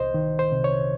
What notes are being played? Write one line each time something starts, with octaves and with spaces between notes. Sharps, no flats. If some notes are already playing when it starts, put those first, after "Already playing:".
Already playing: C2 C5 D#5
D#3
C5
C3
C#5